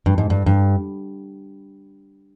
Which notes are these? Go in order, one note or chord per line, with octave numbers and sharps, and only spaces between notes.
G2
G#2
G2
G2